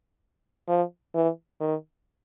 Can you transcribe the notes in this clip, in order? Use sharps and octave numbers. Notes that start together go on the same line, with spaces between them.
F3
E3
D#3